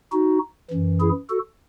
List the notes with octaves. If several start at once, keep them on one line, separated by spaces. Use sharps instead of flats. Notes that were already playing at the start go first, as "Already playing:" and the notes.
D#4 F#4
F#2 E3
E4 G#4
F#4 A4